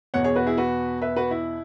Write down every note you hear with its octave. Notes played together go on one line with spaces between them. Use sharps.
E2 B2 B3 C#5 F#5
G#4 C#5
F#4 B4
E4 G#4
F#4 B4
B4 E5
F#4 B4
E4